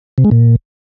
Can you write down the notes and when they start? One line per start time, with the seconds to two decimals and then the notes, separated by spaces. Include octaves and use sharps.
0.18 C3
0.25 G#3
0.31 A#2